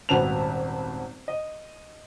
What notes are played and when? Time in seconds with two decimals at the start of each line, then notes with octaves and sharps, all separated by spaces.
0.09 D#1 G#1 F#4 B4 A5 F7
1.28 D#5